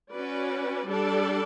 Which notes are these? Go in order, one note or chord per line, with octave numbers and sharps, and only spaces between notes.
C#4 F#4 B4 D5
G3 D4 A4 D5